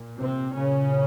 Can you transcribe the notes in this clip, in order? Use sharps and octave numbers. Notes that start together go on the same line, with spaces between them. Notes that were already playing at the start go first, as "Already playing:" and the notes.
Already playing: A#2
C3 C4
A#2 C#3 C#4